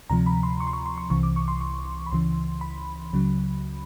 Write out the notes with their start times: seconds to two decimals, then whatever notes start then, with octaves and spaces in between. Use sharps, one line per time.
0.10 D2 C3 F3 A#5
0.26 B5
0.43 C6
0.60 C#6
0.67 C6
0.73 C#6
0.86 C6
0.98 C#6
1.10 C2 C3 E3 C#6
1.23 D6
1.36 C#6
1.48 C6
1.61 C#6
2.06 B5
2.11 C#2 C#3 E3 C6
2.61 B5
3.13 C#2 C#3 F#3